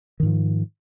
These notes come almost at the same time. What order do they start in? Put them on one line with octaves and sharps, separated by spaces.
D#3 G#2 F3